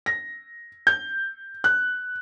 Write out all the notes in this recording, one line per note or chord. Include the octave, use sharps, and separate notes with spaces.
A#6
G6
F#6